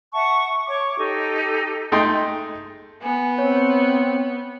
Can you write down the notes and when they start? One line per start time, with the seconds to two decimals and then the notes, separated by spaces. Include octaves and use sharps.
0.14 E5 F#5 A5 C#6
0.66 C#5 C#6 D6
0.98 D#4 G4 A4
1.92 G#3 A3 D#4 G5 C6
3.02 B3 G#5
3.38 C4 C#5